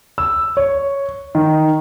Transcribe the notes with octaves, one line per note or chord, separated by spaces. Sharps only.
E6
C#5
D#3